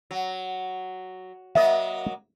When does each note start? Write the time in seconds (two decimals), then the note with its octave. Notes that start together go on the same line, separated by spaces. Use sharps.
0.11 F#3
1.55 F#3 A#3 D#5 E5